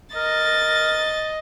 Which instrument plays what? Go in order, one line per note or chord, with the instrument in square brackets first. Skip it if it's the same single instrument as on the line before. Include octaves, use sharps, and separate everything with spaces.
[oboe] A#4 [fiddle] D#5 [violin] A6